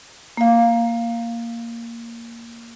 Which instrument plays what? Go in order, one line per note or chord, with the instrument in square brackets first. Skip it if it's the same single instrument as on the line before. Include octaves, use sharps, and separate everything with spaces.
[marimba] A#3 F5